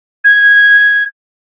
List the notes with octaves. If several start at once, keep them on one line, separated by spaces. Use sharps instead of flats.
G#6